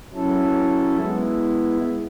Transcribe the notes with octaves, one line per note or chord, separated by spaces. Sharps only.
F#3 C#4 E4 A4
G#3 B3 E4